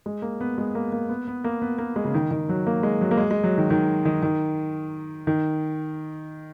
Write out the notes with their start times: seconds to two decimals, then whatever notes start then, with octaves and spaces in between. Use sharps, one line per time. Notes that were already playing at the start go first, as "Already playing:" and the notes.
0.06 G#3
0.22 A#3
0.41 B3
0.58 G#3
0.75 A#3
0.92 A#3
1.09 B3
1.27 B3
1.44 A#3
1.62 B3
1.78 A#3
1.96 G#3
2.05 C#3
2.14 D#3
2.31 D#3
2.49 F#3
2.67 A#3
2.83 G#3
3.01 F#3
3.11 A#3
3.17 G#3
3.31 G#3
3.44 F#3
3.58 D#3
3.70 D#3
4.05 D#3
4.22 D#3
5.27 D#3